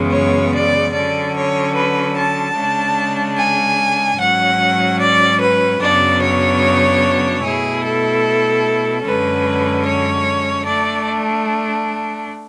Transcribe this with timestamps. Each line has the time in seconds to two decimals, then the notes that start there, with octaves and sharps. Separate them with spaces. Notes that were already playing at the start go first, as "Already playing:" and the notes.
Already playing: F#2 C#3 E3 G#3 B3
0.14 C#5
0.55 D5
0.95 D3 F#3 C#4 D5
1.36 C#5
1.76 B4
2.17 A5
2.57 C#3 G#3 D4
3.38 G#5
4.19 G#2 F#3 C#4 F#5
5.00 D5
5.41 B4
5.81 F#2 C#3 F#3 B3 D4 D5
6.22 C#5
7.44 B2 A3 E4 G#4
7.84 A4
9.06 F#2 D3 G#3 C#4 B4
9.87 C#5
10.67 A3 D4 D5